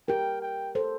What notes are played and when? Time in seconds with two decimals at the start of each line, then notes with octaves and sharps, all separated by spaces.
0.08 G4 A#4 G5
0.42 G5
0.75 A4 C5